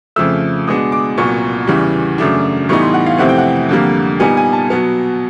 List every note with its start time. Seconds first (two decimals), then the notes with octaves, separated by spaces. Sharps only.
0.16 F2 C#3 F3 A3 E6
0.67 B2 G#3 B3 D4 D#6
0.92 D6
1.17 C2 A#2 F#3 B3 C#6
1.67 E2 C#3 E3 G3
2.18 F#2 C#3 F#3 A3 D4
2.69 A2 E3 G3 B3 D#4 C#6
2.82 C6
2.94 F#5
3.06 F5
3.19 F2 C3 E3 A3 C4 F#5
3.29 G5
3.38 F#5
3.69 F2 D3 G3 A#3
4.20 A#2 G3 B3 D#4 G#5
4.37 G#5
4.53 A5
4.70 B2 F#3 B3